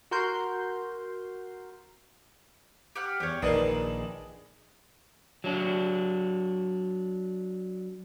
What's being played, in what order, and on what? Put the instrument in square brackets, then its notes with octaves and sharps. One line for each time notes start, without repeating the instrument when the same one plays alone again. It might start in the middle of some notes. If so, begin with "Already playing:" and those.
[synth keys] F#4 A#4 C6 G6
[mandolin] G4 F#5 F6
[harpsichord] E2 [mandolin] G4 C#5
[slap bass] A#1 [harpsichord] D#3 D4 D#4 [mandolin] G#4 [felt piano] B4 D5
[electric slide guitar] F#3 D4